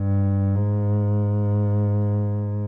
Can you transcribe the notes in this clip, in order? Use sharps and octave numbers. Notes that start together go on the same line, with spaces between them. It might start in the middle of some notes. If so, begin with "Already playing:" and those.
Already playing: G2
G#2